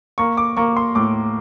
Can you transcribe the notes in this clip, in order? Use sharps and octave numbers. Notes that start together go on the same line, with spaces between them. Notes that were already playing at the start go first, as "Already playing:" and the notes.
A#3 C#6
D6
A#3 C#6
C6
A2 D6